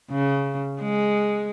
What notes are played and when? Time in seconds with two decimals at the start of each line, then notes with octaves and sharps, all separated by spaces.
0.11 C#3
0.81 G#3